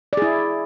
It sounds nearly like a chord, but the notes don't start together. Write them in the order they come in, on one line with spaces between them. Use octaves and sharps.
D5 G#4 E4